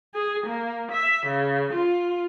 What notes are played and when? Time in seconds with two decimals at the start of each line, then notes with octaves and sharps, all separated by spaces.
0.13 G#4
0.47 A#3
0.91 E5
1.27 C#3
1.73 F4